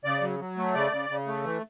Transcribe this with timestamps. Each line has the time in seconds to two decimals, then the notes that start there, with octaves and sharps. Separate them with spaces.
0.04 C#3 D5
0.22 F#3
0.39 F#3
0.57 A3
0.74 C#3 D5
0.92 C#3
1.09 C#3
1.27 A3
1.44 E3